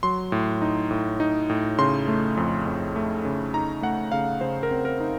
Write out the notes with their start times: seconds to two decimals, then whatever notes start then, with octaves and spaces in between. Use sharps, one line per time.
0.03 F#3 C6
0.32 A2
0.62 D#4
0.91 A2
1.20 D#4
1.50 A2
1.78 C#3 C6
2.08 A3
2.37 F2
2.66 F2
2.96 A3
3.25 C#3
3.54 D#4 A#5
3.82 A3 F#5
4.12 C#3 F5
4.41 C#3 C5
4.63 A#4
4.71 C4
4.85 A#4
5.00 D#4